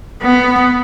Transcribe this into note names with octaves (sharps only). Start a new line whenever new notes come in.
B3